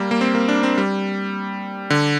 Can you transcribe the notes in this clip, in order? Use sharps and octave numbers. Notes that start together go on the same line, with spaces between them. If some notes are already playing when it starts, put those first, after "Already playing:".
Already playing: G3 A#3
A#3
C4
A#3
D4
C4
G3
D3